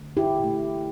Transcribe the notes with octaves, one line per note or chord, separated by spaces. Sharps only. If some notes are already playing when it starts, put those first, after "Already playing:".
Already playing: D3 A3
E4 G4
A#2 A3